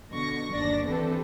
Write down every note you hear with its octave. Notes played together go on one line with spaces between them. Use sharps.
B2 D3 C#6 A#6
G1 D#2 D4 D5 A#6
D3 E3 C4 G4 A4 B4